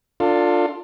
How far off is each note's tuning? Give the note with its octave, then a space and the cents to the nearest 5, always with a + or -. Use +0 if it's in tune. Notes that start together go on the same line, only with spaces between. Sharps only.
D4 +0 F4 +10 A4 +35